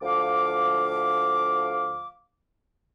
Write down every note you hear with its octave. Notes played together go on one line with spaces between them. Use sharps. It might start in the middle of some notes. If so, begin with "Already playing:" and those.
D2 F3 F5 D6